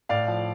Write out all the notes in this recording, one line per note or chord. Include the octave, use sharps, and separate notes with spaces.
A2 D5 F5
F3